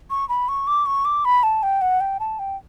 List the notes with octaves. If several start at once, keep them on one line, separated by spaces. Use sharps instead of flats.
C#6
B5
C#6
D6
C#6
D6
B5
A5
G5
F#5
G5
A5
G5